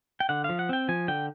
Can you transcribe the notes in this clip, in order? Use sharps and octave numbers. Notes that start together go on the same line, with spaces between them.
G5
D3 F#5
F3 F5
F#5
C4 G5
F3 G#5
D3 G5